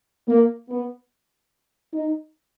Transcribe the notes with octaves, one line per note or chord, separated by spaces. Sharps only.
A#3
B3
D#4